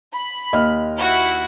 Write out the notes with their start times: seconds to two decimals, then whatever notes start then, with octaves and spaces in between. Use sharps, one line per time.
0.12 B5
0.53 D#2 D#5 F6
0.99 E4 F#4